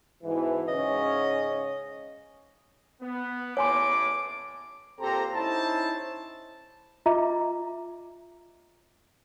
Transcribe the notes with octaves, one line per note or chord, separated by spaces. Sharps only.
G#2 B2 E3
G#2 C#3 C#4 D#5
B3
A1 E2 A2 C#5 G#5 C6 D6
A#2 C4 G4 A4 C5 A#5
C#4 D#4 E4 C5 A5
F4 D#5 E5 A#5 D6